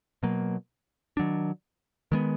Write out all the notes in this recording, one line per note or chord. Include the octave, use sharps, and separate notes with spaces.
B2 F#3 A#3
D#3 F#3 D4
D#3 G#3 B3